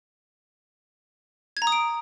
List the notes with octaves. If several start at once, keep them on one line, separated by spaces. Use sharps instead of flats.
G#6
A#5
D#6
D7